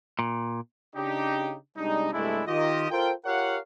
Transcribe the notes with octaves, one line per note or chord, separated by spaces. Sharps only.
A#2
C#3 D4 D#4 G4
C3 G3 G#3 D4 D#4
G2 C3 G#3 A3 D4 E4
D#3 F4 G4 D#5
F4 A4 A#4 C5 G5
F4 G4 A#4 C#5 F5 F#5